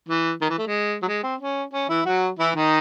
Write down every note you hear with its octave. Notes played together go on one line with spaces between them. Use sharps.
E3
D#3
E3
A3
G#3
F#3
G#3
C4
C#4
C#4
E3 E4
F#3 F#4
E3 E4
D#3 D#4